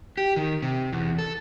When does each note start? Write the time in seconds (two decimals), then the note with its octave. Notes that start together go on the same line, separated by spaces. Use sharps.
0.18 G4
0.36 D#3
0.62 C3
0.92 E2
1.19 A4